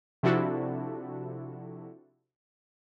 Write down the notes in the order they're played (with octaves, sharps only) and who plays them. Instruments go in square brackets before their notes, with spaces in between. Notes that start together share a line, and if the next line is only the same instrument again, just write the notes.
[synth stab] C3 F3 D4 E4 F#4 A4